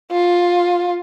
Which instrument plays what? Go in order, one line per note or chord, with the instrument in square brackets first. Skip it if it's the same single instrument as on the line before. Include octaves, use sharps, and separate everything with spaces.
[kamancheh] F4